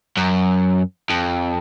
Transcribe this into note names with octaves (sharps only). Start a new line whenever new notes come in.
F#2
F2